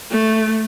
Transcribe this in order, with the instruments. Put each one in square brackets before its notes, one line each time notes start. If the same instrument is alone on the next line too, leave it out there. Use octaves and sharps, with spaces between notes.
[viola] A3